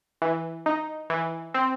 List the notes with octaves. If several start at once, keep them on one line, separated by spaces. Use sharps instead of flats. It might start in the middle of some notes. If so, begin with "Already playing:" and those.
E3
D#4
E3
C4